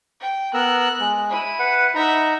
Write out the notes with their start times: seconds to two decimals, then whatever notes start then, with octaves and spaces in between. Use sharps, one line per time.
0.20 G5
0.54 B3 A#4 E6 F#6
1.00 G#3
1.29 E4 D#7
1.59 B4 F#5
1.95 D#4 E5 F#5 A#5